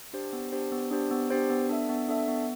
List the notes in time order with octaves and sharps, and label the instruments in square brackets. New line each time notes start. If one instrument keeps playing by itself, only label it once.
[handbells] D4 G4 C5
B3
D4 G4 C5
B3
D4 G4 C5
B3
D4 G4 C5
B3
D4 A4 E5
B3
D4 A4 E5
B3